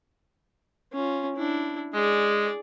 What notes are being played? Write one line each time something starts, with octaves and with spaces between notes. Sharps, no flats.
C#4 F4
D4 E4
G#3 G#4 D5